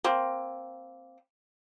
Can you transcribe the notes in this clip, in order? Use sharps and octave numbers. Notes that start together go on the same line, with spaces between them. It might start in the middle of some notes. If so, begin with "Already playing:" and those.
A#3 C4